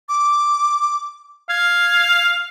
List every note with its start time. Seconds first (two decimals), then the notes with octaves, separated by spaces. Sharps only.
0.09 D6
1.49 F5 G#6